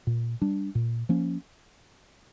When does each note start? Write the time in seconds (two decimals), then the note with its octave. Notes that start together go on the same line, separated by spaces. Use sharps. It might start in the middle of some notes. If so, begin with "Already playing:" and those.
0.07 A#2
0.42 G3 D4
0.75 A#2
1.09 F3 A#3 C#4